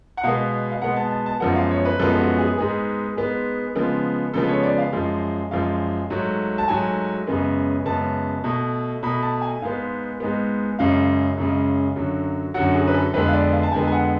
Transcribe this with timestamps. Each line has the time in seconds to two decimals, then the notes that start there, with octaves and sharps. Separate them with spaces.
0.17 F#5
0.23 B2 G#3 B3 F5
0.71 F5
0.82 B2 G#3 B3 F#5
0.96 A5
1.11 A5
1.26 A5
1.40 F#2 F3 G#3 B3 F#5
1.56 F5
1.71 C#5
1.85 B4
1.99 F#2 F3 G#3 B3 A4
2.19 F#4
2.38 G#4
2.57 G#2 G#3 B3 G#4
3.17 G#2 G#3 B3
3.75 C#3 F3 G#3 B3
4.33 C#3 F3 G#3 B3 A4
4.48 C#5
4.63 D5
4.78 F5
4.93 F#2 F3 G#3
5.51 F#2 F3 G#3 F5
6.10 G#2 F#3 A3
6.58 A5
6.68 G#2 F#3 A3 G#5
7.27 F#2 C#3 G#3 B3
7.86 F#2 C#3 G#3 B3 A5
8.44 B2 A3
9.03 B2 A3 B5
9.22 A5
9.42 G#5
9.62 G#2 G#3 B3 F5
10.20 G#2 G#3 B3
10.79 F#2 C#3 G#3 F5
11.37 F#2 C#3 G#3
11.96 F#2 D3 F#3
12.54 F#2 D3 F#3 F#5
12.75 G#4
12.88 B4
12.94 A4
13.13 F2 D3 G#3 B3 B4
13.28 F5
13.34 D5
13.53 F5
13.63 A5
13.72 F2 D3 G#3 B3 G#5
13.87 G#5
13.92 F#5